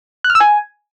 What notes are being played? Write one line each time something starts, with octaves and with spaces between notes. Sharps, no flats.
F#6
F6
E6
G#5